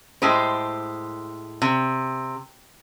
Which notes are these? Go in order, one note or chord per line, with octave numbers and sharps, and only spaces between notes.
A2 G#3 G4 C5
C3